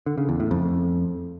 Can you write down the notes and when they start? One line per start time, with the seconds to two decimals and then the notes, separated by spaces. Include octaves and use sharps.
0.06 D3
0.18 C#3
0.29 E2
0.40 A2
0.51 F2